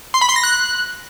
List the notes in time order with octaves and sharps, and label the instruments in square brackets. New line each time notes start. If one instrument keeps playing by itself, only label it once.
[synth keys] C6
B5
C6
A#6
F#6